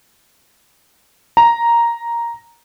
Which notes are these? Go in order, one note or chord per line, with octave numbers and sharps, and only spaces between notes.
A#5